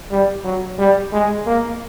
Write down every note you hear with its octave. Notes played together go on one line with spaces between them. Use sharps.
G3
F#3
G3
G#3
A#3